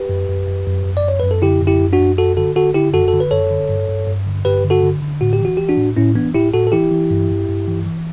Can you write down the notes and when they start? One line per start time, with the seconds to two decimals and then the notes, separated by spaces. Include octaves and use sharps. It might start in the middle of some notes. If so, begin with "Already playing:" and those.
Already playing: G4 B4
0.09 F#2
0.28 F#2
0.48 F#2
0.66 F#2
0.85 F#2
0.97 D5
1.04 F#2 C#5
1.20 F#2 B4
1.31 A4
1.42 D3 E4 G4
1.61 F#2
1.67 E4 G4
1.80 F#2
1.93 D4 F#4
1.99 F#2
2.18 F#2 F#4 A4
2.37 D3 F#4 A4
2.56 D3 F#4 A4
2.74 D3 E4 G4
2.93 F#2 F#4 A4
3.08 A4
3.13 D3
3.20 B4
3.31 F#2 A4 C#5
3.51 D3
3.69 G2
3.88 G2
4.07 G2
4.26 D3
4.45 G2 G4 B4
4.64 D3
4.70 F#4 A4
4.83 D3
5.02 D3
5.21 A2 F#4
5.33 G4
5.40 E3 F#4
5.57 E3 G4
5.69 D4 F#4
5.77 A2
5.97 A2 C#4 E4
6.15 E3 B3 D4
6.34 A2 E4 G4
6.53 A2 F#4 A4
6.67 A4
6.72 E3 E4 G4
6.91 E3
7.11 G2
7.29 G2
7.48 G2
7.68 E3
7.86 E3